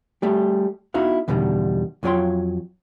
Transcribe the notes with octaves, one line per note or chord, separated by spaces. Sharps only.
G3 A3 G4
B3 D#4 E4 F#4 F5
E2 B2 D3 D#3 G3
F2 F#3 F4 C#5 G5 C6